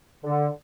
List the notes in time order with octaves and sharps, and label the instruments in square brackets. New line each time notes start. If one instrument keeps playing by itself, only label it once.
[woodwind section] D3